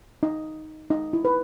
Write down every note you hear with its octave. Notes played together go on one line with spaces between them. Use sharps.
D#4
D#4
E4
B4